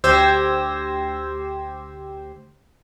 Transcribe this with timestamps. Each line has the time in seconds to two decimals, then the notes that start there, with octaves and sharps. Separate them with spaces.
0.04 D2 G4 C5 E6 G#6 A#6